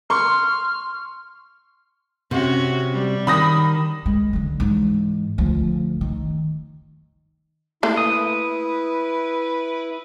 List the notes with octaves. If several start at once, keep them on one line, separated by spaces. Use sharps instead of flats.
C6 C#6 F6
C3 C#4 F#4
G3
D#3 B5 D#6 A#6
G#3
D3 F#3
G#2 E3
D2 F3
D#3
A3 A#3 E4 C6
B4 D#6